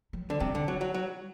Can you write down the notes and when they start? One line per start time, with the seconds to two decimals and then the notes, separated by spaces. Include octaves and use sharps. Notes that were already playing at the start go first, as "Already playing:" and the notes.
0.13 F#3
0.30 D3
0.40 C3 G3
0.55 D3
0.68 F#3
0.81 F#3
0.94 F#3